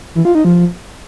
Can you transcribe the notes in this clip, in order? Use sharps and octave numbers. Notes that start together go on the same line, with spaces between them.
E3
F4
D#4
F3